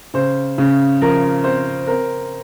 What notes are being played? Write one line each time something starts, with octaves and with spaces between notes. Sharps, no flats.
C#3 C5
C#3
F3 A#4
C4 C5
C4 A#4